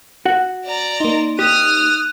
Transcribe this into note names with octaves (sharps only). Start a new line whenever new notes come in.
F#4 F#5
D5 A#5
A#3 D#4 C6
G4 D#6 F6 F#6